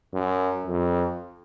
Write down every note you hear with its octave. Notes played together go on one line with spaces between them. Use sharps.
F#2
F2